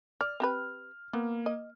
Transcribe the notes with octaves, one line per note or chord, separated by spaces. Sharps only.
D5 F6
C4 G4 B4
A#3 B3
D#5